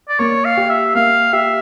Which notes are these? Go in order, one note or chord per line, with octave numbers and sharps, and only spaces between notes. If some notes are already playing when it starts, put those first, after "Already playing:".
D5
A#3 C#5
F5
G4
E5
A#3 F5
G4 E5